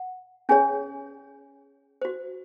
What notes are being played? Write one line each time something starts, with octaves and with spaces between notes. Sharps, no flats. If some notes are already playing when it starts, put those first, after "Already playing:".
Already playing: F#5
C#4 G#4 C#5 G#5
F#4 C5